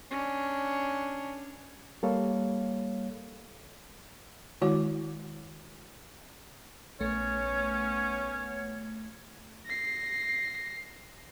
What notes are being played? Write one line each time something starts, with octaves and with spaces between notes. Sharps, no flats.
C#4 D4
G3 A#3 A4 C#5 F5
D#3 G#3 E4 F#4 C#5 D6
A#1 A3 B3 C#4 C#5 C#7
A#6 C7